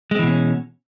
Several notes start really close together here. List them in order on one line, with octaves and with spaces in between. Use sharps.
G#3 C4 E3 B2 C#4